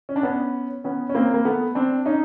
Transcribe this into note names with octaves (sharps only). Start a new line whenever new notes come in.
C#4
D4
B3 C#4
B3 C#4
C#4
A#3 C4
A#3
A3 B3
C4 D4
C#4 D#4